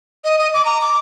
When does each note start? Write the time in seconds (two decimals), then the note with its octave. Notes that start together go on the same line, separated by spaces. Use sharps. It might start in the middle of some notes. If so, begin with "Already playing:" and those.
0.24 D#5
0.39 D#5
0.54 D6
0.65 A#5
0.81 D6